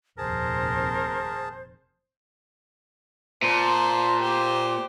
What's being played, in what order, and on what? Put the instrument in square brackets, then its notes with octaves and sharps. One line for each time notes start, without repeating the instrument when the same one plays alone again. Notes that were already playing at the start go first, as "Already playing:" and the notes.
[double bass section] F1 D#2 A#2 [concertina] G#4 A5 [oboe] A#4 [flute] C5
[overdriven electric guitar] A#2 [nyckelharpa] C5 A5
[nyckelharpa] G4 C5